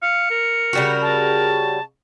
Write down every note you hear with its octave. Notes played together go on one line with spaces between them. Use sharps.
F5 C#7
A#4
C#3 G3 F#4
A5